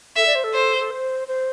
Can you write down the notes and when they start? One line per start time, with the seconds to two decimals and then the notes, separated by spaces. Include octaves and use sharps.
0.16 A4 E5
0.26 D5
0.35 C5
0.44 A4
0.53 C5
0.79 A4
0.91 C5
1.28 C5